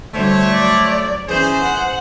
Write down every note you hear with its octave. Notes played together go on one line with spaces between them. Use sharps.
D2 G3 A3 C5 C#5
F#3 D5
E3 C#4 G#4 C5
F#5